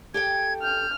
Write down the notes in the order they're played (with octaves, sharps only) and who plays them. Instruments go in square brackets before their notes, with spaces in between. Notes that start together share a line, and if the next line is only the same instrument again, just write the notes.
[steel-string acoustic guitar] G4 A4 G5 [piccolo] G#6
[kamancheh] F6 [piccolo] G6